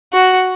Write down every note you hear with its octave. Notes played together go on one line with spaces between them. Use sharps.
F#4